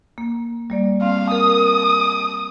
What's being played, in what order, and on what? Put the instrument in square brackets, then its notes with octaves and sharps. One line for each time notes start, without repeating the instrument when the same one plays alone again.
[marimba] A#3
G3 A#3 D5
[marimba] C4 [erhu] F5
[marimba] A#4 [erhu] D#6